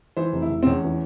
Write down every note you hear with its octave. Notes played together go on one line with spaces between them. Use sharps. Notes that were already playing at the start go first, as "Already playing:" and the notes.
E3 C5
F1
E4
F1
C4
E2 C#4
E3